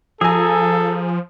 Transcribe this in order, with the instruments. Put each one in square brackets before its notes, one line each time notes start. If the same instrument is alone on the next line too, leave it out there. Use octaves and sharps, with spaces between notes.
[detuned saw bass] F3 [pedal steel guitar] G#4 A#5 [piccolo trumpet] A4 [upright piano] G#5 E6